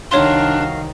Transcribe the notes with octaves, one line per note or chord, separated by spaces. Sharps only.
C2 D#3 D4 F#4 C#5 F5 C6